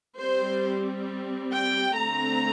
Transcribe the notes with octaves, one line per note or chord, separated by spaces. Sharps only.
G3 C4 C5
G5
D3 A3 C4 A#5